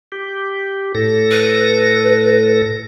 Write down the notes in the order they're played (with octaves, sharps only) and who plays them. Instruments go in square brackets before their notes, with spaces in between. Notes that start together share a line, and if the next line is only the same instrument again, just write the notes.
[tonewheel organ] G4
A2 A4 A#6
[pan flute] B4